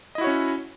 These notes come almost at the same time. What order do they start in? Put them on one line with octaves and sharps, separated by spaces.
D#5 E4 F#4 C#5 C#4